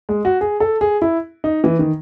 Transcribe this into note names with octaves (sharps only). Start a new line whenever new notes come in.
G#3
F#4
G#4
A4
G#4
E4
D#4
E3
D#3